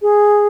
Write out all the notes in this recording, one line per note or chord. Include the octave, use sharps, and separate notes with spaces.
G#4